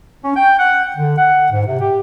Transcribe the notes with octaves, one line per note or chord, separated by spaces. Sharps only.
C#4
G5
F#5
D3
F#5
G#2
C3
G4